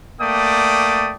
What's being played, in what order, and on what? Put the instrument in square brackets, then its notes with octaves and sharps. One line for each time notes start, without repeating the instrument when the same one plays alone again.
[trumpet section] A3 A#3 D5 G5 D#6